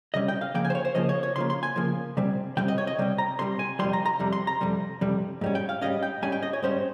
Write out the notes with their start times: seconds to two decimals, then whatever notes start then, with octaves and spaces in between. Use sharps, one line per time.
0.14 C3 G3 C#4 D#5
0.28 G5
0.41 F5
0.54 C#3 F3 A#3 G5
0.65 G#5
0.70 C5
0.75 C#5
0.85 C5
0.95 C#3 F3 A#3 D#5
1.09 C#5
1.23 C#5
1.36 C#3 F3 A#3 C6
1.50 C6
1.63 G#5
1.76 C#3 F3 A#3
2.17 C3 G3 C4
2.57 C3 G3 C4 G5
2.68 D#5
2.78 C#5
2.87 D#5
2.98 C3 G3 C4
3.18 A#5
3.39 C3 G3 C4 C6
3.59 G#5
3.79 F2 C3 G3 C6
3.93 A#5
4.06 A#5
4.19 F2 C3 G3
4.33 C6
4.47 A#5
4.61 F2 C3 G3
5.01 F2 C3 G3
5.41 G#2 G3 C#4
5.55 G5
5.69 F5
5.81 G#2 G3 C#4 D#5
6.03 G5
6.22 G#2 G3 C#4 G#5
6.32 G5
6.43 D#5
6.53 C#5
6.62 G#2 G3 C#4 C5